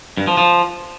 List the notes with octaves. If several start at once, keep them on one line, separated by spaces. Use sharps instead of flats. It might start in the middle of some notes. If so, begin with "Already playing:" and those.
G2
F3
F3